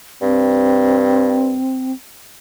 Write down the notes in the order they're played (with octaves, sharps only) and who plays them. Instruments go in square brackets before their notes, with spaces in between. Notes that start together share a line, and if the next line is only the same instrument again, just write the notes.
[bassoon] G2 [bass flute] C4